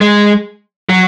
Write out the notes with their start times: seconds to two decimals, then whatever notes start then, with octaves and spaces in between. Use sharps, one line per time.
0.01 G#3
0.89 F#3